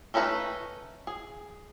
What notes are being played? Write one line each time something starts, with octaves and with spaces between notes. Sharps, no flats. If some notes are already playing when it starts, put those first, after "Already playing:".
A3 C#4 D#4 B4 A5
G#4